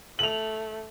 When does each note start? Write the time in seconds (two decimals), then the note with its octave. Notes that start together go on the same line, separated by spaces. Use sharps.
0.19 A3 F7 F#7